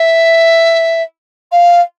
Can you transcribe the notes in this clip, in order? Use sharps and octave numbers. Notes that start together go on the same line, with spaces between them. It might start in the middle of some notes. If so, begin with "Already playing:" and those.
Already playing: E5
F5